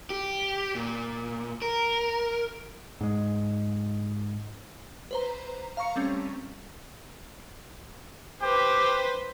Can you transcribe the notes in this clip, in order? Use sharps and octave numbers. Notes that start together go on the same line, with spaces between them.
G4
A#2
A#4
G#2 G#3
B4 C5 A#5
F5 A#5 C#6 C#7
G3 A3 C4 C#4
G4 B4 C5